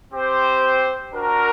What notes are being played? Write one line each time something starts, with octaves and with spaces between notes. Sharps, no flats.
C4 G4 C5
D4 F#4 A#4